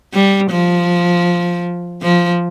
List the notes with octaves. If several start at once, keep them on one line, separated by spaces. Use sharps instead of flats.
G3
F3
F3